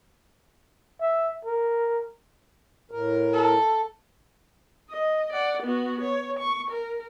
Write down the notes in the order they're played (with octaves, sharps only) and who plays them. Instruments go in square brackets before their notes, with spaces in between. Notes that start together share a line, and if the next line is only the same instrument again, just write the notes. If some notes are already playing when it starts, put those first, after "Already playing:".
[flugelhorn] E5
A#4
[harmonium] A2 A#4
[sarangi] A4
[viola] D#5
D5 F#5
B3 F#4
C#5
C#6
A#4